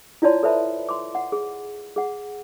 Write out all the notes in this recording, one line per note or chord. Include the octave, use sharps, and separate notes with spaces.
E4 F4 C#5 D5 A5 C6
A4 B4 C5 E5 A5 B5
C6 D6
F#5
G#4
G#4 F#5